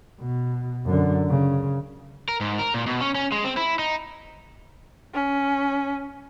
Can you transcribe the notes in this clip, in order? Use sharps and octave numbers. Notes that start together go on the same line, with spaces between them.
B2
F#2 D3
C#3
A#4
G#2
A#4
A#2
B2
C#4
C#4
G#3
C4
E4
D#4
C#4